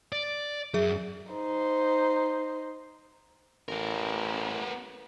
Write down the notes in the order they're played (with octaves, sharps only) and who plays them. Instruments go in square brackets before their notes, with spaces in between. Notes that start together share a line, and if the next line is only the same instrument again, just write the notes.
[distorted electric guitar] D5
[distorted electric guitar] F#2 [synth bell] G#4 E5
[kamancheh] D#4 C5
[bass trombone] A1 [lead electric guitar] B3 A#4